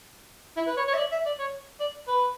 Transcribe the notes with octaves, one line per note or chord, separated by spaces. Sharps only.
E4
B4
C#5
C#5
E5
D5
E5
D5
C#5
D5
B4